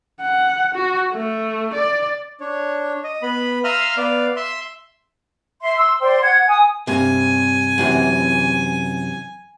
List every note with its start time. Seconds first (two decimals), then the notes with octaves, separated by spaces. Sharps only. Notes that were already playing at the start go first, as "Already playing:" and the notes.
0.21 F#5
0.75 F#4
1.12 A3
1.74 D5
2.40 D4 C#5
3.04 D#5
3.22 B3 B5
3.64 E5 F5 A#5 C6 D#6 F6
3.97 B3 D5 F5
4.36 E5 C6
5.62 E5 C6
5.77 C6 E6
6.01 C5 D5 G5 C6
6.21 F#5 G#6
6.46 G#5 D#6
6.87 G2 C3 G#5
7.78 F#2 C3 E3